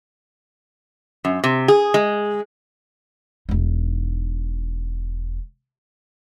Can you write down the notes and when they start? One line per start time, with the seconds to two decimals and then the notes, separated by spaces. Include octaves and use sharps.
1.25 F#2
1.44 C3
1.68 G#4
1.94 G#3
3.49 E1 D#4